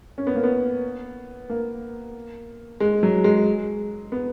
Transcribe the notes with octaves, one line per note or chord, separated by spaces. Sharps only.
C#4
B3
A#3
B3
A#3
G#3
F#3
G#3
B3